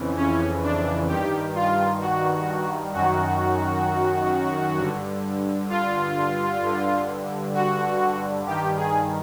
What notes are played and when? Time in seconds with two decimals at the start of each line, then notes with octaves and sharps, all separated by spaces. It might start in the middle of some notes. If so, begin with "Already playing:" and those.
Already playing: F2 C#3 E3
0.16 C#4
0.63 D4
1.08 G2 D#3 G4
1.55 F4
2.01 F#4
2.93 F#2 D#3 F#4
4.78 G2 D3
5.69 F4
6.61 G2 D3
7.54 F#4
8.47 G2 D#3 G4
8.77 G#4